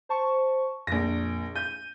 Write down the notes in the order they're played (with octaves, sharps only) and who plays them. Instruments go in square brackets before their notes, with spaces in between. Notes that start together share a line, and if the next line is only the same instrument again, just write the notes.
[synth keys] C5 A5 C#6
[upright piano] A#1 A#6 [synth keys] F2
[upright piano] G6 [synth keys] D#7